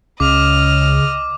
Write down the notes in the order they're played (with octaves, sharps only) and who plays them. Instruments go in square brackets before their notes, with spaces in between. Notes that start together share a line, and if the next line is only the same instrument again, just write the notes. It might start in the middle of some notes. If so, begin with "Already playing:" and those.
[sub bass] C#2 [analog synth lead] C#3 [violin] D#5 F6 [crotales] D6